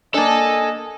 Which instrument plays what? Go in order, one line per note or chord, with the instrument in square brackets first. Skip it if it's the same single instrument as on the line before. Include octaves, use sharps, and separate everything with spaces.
[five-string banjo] A#3 D4 [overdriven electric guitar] A4 A5 [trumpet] D#5 [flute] G#5